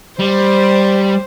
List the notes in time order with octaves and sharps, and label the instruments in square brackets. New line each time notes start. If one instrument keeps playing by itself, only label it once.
[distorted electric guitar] G3 [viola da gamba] C5